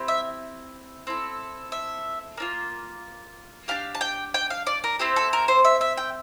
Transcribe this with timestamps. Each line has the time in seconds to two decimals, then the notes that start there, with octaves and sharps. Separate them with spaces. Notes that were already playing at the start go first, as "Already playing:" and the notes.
Already playing: C4 E4 G4
0.08 E5
1.07 C4 E4 A4
1.72 E5
2.37 A#3 D4 F4
3.68 D4 G4 F5
3.95 A5
4.01 G5
4.34 G5
4.50 F5
4.67 D5
4.84 A#4
4.99 C4 E4 G4 C5
5.16 A4
5.33 A#4
5.48 C5
5.65 E5
5.81 E5
5.97 G5